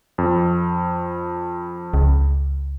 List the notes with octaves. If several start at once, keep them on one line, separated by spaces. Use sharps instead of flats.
F2
C#2